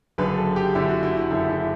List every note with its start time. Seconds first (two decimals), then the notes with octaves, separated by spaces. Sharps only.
0.18 F#1 F#2 D3 B4
0.38 A4
0.56 G4
0.75 F#1 F#2 D3 E4
0.88 F#4
1.03 E4
1.17 E4
1.31 F#1 F#2 D3 E4
1.49 E4